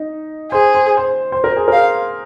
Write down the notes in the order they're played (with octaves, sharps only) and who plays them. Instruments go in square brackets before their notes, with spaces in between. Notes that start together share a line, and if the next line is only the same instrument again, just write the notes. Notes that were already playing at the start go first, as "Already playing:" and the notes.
Already playing: [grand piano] D#4
[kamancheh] G#4 [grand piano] C5
[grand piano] C5
C5
C5
A#4
G#4
[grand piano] A#4 [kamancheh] F5